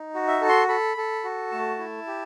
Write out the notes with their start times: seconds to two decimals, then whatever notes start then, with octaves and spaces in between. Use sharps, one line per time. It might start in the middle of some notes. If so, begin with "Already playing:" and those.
Already playing: D#4
0.15 F#4
0.27 E5
0.41 A4
0.49 C6
0.68 A4 B5
0.97 A4
1.24 F#4
1.52 A3 A5
1.79 E4
2.07 G4